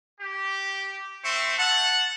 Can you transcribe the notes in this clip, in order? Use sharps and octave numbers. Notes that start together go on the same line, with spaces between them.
G4
C4 E5 C#6
F#5 A5